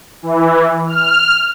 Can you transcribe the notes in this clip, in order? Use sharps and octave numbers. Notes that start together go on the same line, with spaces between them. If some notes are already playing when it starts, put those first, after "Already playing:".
E3
F6